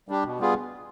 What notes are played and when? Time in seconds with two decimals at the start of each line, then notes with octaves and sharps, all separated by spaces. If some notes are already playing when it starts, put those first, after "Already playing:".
0.09 G3 D4 G4
0.24 B2
0.39 G3 B3 F4 G#4